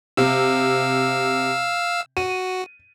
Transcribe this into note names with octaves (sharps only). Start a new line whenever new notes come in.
C3 F5 E6
F#4 D#7